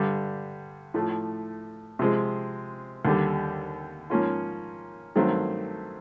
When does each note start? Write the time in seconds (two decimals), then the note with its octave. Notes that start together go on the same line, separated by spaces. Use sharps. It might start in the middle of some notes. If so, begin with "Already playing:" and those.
Already playing: G2 D3 G3
0.94 A2 F3 A3
1.99 C3 F3 G#3 C4
3.05 D#2 D3 G3
4.10 G#2 F3 A#3 C#4 F4
5.16 G2 D#3 F#3 A3 C4